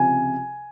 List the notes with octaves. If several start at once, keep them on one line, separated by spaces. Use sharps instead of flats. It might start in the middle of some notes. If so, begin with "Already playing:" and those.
Already playing: C#2 C3 F3 G#5